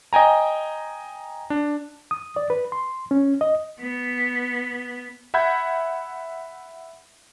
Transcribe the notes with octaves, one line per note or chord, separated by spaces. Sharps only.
D#5 G5 G#5 A#5
D4
D#6
D5
B4
C6
C#4
D#5
B3
E5 F#5 B5 G6 G#6